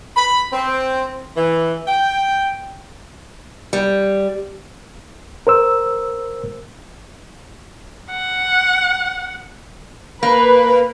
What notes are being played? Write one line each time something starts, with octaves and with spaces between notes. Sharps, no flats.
B5
C4
E3
G5
G3
A#4 C5 E6
F#5
A#3 B4